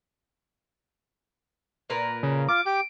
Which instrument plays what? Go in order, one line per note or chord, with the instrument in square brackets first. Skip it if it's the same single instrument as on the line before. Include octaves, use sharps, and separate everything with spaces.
[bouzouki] A#2 A#4 B4
[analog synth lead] C#3
[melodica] F4 [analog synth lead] D6
[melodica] G4 G5 D6 [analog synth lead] D7